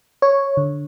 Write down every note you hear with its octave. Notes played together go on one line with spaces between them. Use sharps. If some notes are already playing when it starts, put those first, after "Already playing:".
C#5
D3